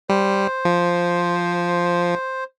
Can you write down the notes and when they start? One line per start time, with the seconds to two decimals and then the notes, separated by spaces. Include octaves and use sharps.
0.10 G3 C5
0.65 F3